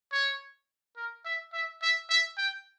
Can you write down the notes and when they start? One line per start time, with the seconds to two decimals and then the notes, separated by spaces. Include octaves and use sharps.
0.12 C#5
0.97 A#4
1.25 E5
1.53 E5
1.82 E5
2.10 E5
2.38 G5